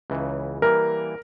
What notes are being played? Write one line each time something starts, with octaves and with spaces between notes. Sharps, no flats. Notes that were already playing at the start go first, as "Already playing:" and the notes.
C#2 C#3 E3
E3 G3 A#3 A#4